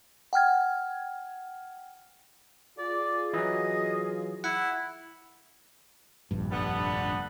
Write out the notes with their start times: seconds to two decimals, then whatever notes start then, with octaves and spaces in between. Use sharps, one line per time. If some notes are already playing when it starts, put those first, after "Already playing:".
0.33 F#5 G5 F6 G#6
2.78 F4 G#4 D5
3.33 E3 F#3 D#5
4.44 E4 F#5
6.31 F1 A#1 G2
6.51 D3 G3 B3